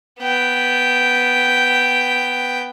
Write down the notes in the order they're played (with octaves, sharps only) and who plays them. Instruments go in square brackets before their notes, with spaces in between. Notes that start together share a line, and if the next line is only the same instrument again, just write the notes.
[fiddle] B3 G5